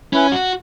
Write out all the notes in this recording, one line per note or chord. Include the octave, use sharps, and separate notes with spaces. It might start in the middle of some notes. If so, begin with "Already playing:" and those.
C#4 E4 B4 G#5
F#4